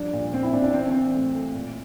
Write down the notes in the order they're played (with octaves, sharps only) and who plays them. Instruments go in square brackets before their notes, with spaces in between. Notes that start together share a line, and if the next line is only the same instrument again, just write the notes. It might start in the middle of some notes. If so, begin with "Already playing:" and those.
Already playing: [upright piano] G2 F3 D4
A#2
A#2 C4
E4
A#2 D4
D4
E3 C4
E3 C4
A2
A3
A#2